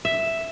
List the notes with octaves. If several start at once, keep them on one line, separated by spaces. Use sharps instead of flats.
E5